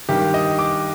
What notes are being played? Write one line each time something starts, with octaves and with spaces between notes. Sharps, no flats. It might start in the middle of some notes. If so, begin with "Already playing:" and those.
G2 D#3 G4
D#5
D6